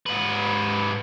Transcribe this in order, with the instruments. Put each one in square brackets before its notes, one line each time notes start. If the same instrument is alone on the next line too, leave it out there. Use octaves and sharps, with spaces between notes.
[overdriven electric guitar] G#2 B4